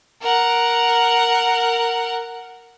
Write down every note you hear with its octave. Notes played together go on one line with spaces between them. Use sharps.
A#4 F#5